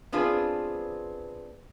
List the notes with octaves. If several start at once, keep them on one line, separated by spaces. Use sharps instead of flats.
B3 C4 D4 F4 G#4 B4